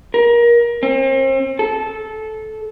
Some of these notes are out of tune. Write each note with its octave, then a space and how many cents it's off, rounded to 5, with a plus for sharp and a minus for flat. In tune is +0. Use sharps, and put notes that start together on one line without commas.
A#4 +25
C4 +40
A4 -15